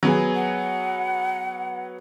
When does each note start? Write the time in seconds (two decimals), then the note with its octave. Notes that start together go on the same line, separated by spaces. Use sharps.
0.03 F#3 B3 G#4
0.35 F#5